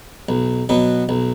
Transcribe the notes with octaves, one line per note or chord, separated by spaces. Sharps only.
B1
B2 F#3 B3
B1